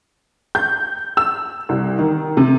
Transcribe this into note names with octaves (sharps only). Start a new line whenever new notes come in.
G6
E6
C2
D#3
C3